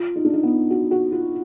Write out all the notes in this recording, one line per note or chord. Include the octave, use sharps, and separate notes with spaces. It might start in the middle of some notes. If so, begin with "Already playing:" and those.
Already playing: F4
D#4
D4
D#4
B3
F#4
F#4
F4